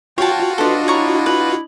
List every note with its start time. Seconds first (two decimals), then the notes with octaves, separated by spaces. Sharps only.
0.18 F4 F#4 C#5 G5 A5
0.58 D4 A4 B4 C5 D#5
0.88 E4 C#5 A#5 C#6
1.26 B4